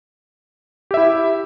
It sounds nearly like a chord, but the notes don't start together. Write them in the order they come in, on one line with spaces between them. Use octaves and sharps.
G4 E5 E4